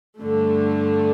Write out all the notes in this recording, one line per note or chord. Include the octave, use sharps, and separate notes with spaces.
G2 D3 A3